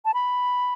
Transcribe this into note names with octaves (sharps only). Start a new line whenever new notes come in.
A5
B5